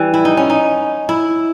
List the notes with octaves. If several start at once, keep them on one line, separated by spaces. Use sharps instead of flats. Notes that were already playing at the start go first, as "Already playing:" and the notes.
Already playing: E3 G3
E4
D#4
C#4
D#4
E4